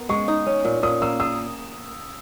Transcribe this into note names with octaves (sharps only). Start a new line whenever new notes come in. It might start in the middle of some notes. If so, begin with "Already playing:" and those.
Already playing: B3 A#4
G#3 C#6
D#4
C#4
A#2
A#2 D#6
A#3 E6
G#4 E6